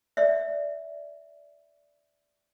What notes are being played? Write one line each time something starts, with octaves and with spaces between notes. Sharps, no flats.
D5 E5